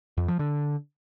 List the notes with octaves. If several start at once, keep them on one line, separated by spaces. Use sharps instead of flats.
F2
F3
D3